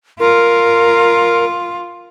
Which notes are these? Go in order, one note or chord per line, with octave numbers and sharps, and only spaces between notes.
F4 A#4